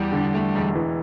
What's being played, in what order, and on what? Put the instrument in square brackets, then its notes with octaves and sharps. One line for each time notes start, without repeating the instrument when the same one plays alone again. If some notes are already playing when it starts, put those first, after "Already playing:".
Already playing: [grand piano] E2 [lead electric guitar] G3
[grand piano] D3
A3
E1
E3